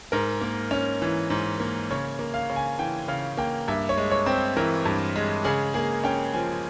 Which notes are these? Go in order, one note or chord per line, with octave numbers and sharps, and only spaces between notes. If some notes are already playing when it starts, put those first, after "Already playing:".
G#2 A#4
A#3
C#4
E3
G#2
A#3
C#3 C#5
A#3
F5
C#3
G#5
E3 G5
C#3 F5
A#3 G5
G2 E5
C#5
G#3
C#5
C4
C5
E3 A#4
G2
G#3
C#3 G#4
A#3 G#4
C#4 G5
F3 G#5